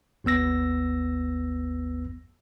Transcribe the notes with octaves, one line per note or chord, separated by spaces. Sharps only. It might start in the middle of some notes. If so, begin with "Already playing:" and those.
G#1 D#2 B3 E6 A#6